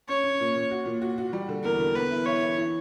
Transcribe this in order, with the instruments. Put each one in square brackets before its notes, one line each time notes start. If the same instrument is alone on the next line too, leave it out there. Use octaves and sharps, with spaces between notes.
[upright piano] C#4 [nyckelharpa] C#5
[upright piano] C#4
A#2
A#2
F#4
A#2
F#4
F#4
G3
D3
[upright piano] E2 [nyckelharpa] A#4
[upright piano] D3
[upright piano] B3 [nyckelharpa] B4
[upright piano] E3
[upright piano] E4 [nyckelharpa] C#5
[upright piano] E3
E3